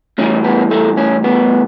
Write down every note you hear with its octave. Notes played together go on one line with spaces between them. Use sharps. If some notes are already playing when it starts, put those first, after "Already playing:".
A2 E3 G3 C#4
B3
A3
C#4
B3